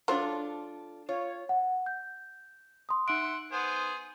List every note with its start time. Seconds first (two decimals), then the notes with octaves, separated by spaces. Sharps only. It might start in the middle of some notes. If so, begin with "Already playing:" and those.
0.08 F#3 D4 F4 A4 C5
1.09 F4 C#5
1.49 F#5
1.86 G6
2.89 C6 D#6
3.08 D#4 E5 F#5 C6 D7
3.52 B3 G#4 C5